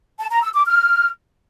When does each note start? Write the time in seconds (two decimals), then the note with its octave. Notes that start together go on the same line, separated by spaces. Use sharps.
0.19 A5
0.31 A#5
0.43 E6
0.54 D6
0.66 F6